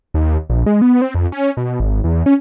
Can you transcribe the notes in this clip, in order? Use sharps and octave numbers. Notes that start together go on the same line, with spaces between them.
D#2
A#1
G#3
B3
C4
F2
C#4
B2
G#1
E2
C#4